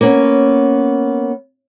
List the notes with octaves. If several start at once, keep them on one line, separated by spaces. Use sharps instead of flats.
A#3 B3 C#4